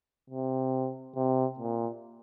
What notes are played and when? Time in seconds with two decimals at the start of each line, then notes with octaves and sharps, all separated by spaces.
0.30 C3
1.16 C3
1.59 A#2